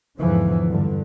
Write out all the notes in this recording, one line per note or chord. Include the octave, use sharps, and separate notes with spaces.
E2 G#2 D3 E3 F3
G2 D3